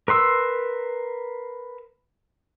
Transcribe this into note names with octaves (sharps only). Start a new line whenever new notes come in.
A#4 B4 C6 E6